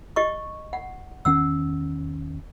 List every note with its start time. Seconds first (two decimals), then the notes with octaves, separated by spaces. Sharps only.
0.16 G4 D#5 C#6
0.73 F#5
1.25 E2 D#3 C#4 F#5 E6